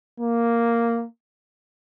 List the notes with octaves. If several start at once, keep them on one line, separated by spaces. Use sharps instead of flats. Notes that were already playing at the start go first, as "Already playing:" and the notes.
A#3